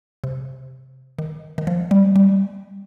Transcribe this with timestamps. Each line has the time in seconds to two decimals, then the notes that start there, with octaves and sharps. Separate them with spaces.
0.24 C3
1.19 D#3
1.58 D#3
1.67 F3
1.91 G3
2.16 G3